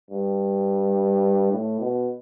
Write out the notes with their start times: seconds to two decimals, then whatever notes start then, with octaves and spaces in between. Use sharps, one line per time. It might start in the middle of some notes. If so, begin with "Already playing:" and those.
0.11 G2
1.52 A2
1.80 B2